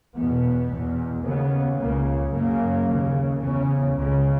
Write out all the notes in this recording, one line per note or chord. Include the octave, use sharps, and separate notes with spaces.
E2 B2 B3
E2 B2
D#2 C#3 B3
C#2 C#3 A#3
F#2 C#3 A#3
D#2 C#3
E2 C#3 C#4
C#2 C#3